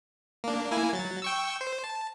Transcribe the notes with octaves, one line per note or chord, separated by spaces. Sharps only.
A#3 D4
A#3 E4 G#5
F#3 A6
G5 C#6 E6
C5
A5